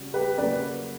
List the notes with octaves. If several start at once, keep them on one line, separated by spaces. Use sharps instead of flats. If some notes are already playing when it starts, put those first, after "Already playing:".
Already playing: C#3 G3 C#4 F#4
G4 B4
C#3 F#3 A#3 B4 D5